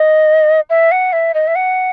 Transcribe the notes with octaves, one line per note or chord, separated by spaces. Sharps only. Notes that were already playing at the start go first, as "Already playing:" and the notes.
Already playing: D#5
E5
F#5
E5
D#5
E5
F#5